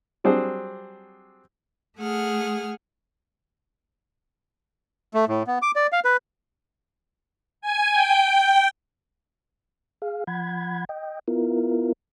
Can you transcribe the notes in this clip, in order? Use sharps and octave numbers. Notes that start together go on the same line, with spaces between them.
F#3 G3 C4 D4 G#4 C5
A3 G#4 F#5 F6
A3
A2
B3
D6
D5
F5
B4
G#5
G5
G#4 F5
F3 F#5 B5 G#6
D#5 G5
B3 E4 F4 A#4